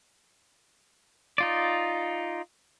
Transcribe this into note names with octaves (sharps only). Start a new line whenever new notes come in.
D#4 F4 D5